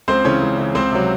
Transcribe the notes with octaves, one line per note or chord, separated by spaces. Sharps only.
C#2 C4 C5
C#3 E3 C#4 C#5
C#2
C#3 E3
C#2 C4 C5
C3 F#3